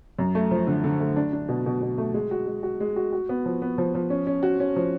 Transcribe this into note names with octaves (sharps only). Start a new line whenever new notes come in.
F#2
A3
F3
D3
D3
A3
D4
D4
B2
B2
B2
A3
G#3
F#4
G#3
F#4
G#3
F#4
F#4
B3
F3
B3
F3
F3
C#4
C#4
F#4
C#4
F3